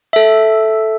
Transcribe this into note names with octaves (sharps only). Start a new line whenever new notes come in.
A4 E5